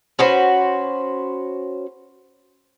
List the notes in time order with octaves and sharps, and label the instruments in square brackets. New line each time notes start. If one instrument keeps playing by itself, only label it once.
[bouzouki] C#4 F#4 B4 C5